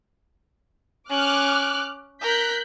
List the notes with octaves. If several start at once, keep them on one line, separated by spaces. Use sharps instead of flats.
C#4 D6 F6 F#6
A#4 F#6 G6 B6